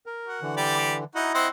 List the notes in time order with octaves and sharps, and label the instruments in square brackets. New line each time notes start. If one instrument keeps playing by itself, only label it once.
[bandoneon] A#4
[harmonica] F#4
[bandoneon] D3 E3
[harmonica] G3 G4 D5
[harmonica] D#4 F#4 [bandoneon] E4 D#5
[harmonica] C4 C5 F#5